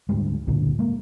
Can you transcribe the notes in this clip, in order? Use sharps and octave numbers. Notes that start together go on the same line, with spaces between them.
D2 G#2 G3 G#3
C#2 G2 A#2 D3
G#3 A#3